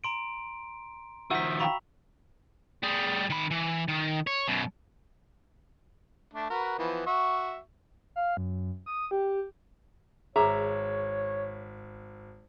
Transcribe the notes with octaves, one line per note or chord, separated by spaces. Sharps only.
A#5 C6 D7
D#3 F3 F#4 E5 F#5 E6 B6
F#4 F5 G5 A#5 B5 C#6
G3 G#4
D#3 B5
E3
D#3
C#5
F#2 B2
A3 D4
F#4 A#4 B4
E3 F3 B3
F#4 E5 C#6
F5
F#2
D#6
G4
G#1 G#4 B4 C#5 E5 A#5 D6